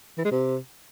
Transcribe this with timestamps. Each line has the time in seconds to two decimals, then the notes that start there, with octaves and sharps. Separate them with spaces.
0.18 E3
0.25 G#3
0.32 C3